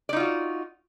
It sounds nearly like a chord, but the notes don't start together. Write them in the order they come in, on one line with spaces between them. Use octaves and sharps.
D5 D#4 F4 F#4